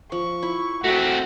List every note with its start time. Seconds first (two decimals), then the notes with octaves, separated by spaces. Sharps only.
0.12 F3 C#6
0.43 E4
0.84 A3 C4 F#4 F#5